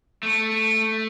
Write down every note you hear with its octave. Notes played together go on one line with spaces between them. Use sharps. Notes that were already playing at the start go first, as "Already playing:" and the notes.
A3